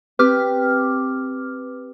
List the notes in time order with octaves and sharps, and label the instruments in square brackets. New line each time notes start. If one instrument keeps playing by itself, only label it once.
[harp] C4 G4 [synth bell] B4 D6 F6